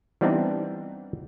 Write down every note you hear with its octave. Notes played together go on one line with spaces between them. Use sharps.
E3 G3 B3 C4 D4 D#4